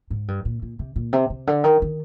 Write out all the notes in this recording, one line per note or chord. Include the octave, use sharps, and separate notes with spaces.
G#2
G2
A#2
A#2
C3
A#2
C3
C3
D3
D#3
D#3